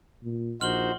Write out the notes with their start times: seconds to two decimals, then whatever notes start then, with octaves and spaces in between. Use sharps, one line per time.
0.23 A#2
0.61 A#1 D#4 F#4 C5 F6 F#7 G7